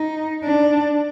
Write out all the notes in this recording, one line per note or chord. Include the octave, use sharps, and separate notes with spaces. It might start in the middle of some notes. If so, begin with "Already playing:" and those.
Already playing: D#4
D4